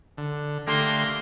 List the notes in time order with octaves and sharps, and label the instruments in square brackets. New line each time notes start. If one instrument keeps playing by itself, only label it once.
[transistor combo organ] D3
[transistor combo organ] D3 A3 G4 [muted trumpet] A#3 [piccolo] C6